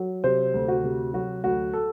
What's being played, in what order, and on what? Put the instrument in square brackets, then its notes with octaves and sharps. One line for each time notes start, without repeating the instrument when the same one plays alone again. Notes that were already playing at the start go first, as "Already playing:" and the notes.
Already playing: [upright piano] F#3
C3 C5
D2
F#4
C3
F#3 F#4
D2 F#4
A4